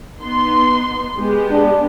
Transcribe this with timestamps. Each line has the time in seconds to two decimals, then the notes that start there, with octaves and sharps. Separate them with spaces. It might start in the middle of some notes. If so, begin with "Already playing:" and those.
0.20 B3 D#4 C6
1.17 G#3 B3 G4
1.51 D4